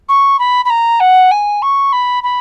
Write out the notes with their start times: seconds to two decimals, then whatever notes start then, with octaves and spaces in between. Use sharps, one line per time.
0.08 C#6
0.39 B5
0.65 B5
0.70 A#5
1.00 F#5
1.31 G#5
1.62 C#6
1.92 B5
2.23 B5